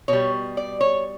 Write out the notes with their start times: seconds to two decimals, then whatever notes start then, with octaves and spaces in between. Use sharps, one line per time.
0.08 B2 G3 C#5
0.57 D5
0.81 C#5